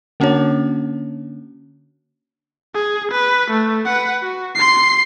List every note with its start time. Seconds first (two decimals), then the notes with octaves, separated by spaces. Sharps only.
0.20 D3 A#3 C#4 D4 F#4 C#5
2.75 G#4
3.12 B4
3.51 A3
3.86 B4 F#5
4.23 F#4
4.55 C6 C7